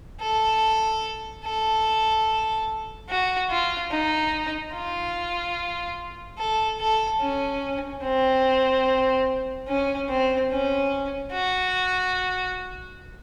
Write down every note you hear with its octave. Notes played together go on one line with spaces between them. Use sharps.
A4
A4
F#4
F4
D#4
F4
A4
A4
C#4
C4
C#4
C4
C#4
F#4